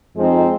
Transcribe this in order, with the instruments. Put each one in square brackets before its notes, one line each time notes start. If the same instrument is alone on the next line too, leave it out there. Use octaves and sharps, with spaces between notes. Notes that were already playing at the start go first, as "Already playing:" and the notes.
[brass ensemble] F2 F3 G#3 C4 D#4